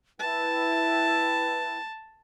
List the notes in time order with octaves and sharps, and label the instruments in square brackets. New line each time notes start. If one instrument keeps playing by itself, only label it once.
[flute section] E4 B4 G5 [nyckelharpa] A5